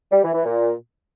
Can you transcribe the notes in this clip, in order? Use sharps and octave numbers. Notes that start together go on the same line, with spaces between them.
G3
E3
E3
A#2